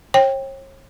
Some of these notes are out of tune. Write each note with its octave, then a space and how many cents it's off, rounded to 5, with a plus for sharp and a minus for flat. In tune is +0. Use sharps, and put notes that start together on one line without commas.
C#5 -40 G5 +5